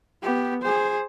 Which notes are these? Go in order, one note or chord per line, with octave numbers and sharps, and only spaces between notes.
B3 G4
G#4 C5